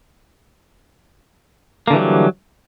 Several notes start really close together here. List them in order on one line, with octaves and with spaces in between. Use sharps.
A#3 D3 E3 G3 F#3